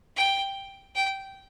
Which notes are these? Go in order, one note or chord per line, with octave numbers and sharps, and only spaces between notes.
G5
G5